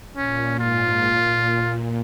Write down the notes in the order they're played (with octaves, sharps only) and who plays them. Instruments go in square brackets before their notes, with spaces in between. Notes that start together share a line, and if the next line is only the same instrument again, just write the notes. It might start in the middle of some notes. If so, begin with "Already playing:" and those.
[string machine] A#2 [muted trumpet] C#4
[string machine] G#2 [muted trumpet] F4
[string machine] A#2